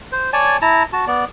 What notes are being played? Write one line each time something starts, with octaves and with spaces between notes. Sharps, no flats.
C5
C#5 D5 G#5 A5
E4 A5 A#5
F#4 A5
B3 D5